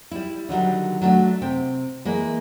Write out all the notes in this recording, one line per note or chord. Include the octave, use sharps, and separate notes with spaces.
G3 E4
D3 D#3 F#3 G3
F#3 A3 D4
C3 G5
E3 G#3 A#3